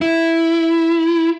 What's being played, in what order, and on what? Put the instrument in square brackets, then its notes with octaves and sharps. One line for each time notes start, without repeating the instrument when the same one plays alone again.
[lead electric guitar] E4